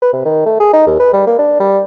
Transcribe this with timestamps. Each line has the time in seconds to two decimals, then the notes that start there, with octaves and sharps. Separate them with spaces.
0.02 B4
0.13 C3
0.26 D#3
0.46 A3
0.60 G#4
0.73 D#4
0.87 D#2
1.00 B4
1.14 G3
1.27 A#3
1.39 D4
1.60 G3